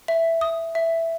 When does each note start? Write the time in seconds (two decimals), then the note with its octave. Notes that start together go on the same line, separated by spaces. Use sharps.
0.08 E5
0.41 D#6
0.75 E5